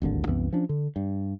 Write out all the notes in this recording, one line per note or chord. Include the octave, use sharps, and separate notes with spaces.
D1 G#1 D#2 D3
C2 F#2 E3 B3
F3 C#4 D4
D3
G2